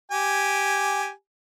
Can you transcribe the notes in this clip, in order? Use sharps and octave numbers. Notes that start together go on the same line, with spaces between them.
G4 G#5